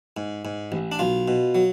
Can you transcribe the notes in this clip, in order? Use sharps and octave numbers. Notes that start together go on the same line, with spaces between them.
G#2
G#2
A1
D4
B1 F4
B2
F#3